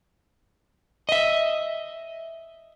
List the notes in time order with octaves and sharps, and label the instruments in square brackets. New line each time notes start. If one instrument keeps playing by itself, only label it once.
[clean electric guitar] D#5 E5